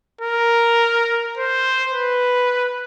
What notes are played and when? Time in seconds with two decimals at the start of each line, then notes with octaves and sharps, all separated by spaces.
0.21 A#4
1.37 C5
1.93 B4